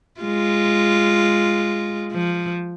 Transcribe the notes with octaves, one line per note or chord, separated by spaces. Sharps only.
G#3 F4
F3